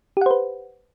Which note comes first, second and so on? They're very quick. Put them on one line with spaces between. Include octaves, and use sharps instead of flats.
G4 F#5 C5 B4